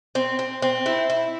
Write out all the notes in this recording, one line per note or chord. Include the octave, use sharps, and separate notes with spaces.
C4
C4
C4
E4
E4